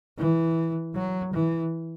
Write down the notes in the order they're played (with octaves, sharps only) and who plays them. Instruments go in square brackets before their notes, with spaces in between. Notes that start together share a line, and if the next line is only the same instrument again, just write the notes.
[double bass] E3
F#3
E3